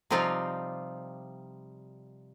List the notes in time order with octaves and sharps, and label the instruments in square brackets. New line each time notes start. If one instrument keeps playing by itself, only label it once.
[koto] C3 F3 G3 C4 D#4 F4